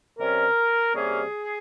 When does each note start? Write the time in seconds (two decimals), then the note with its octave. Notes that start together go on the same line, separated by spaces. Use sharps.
0.19 C3 G3 C#4 A#4
0.95 C3 G3 A#3 C#4 G#4